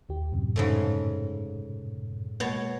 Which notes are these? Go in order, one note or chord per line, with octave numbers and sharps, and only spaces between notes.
D#2 G4
F#2 A2 C3
G#2 C#3 A3
B2 G#3 A#3 C#5 A5